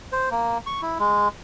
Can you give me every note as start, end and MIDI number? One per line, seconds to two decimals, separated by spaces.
0.12 0.29 72
0.31 0.58 58
0.67 0.81 85
0.82 0.98 64
0.99 1.28 56